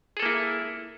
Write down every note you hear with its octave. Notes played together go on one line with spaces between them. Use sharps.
A#3 E4 G#4 A4